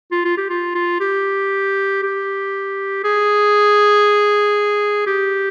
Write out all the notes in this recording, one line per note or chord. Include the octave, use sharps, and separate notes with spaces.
F4
F4
G4
F4
F4
G4
G4
G#4
G4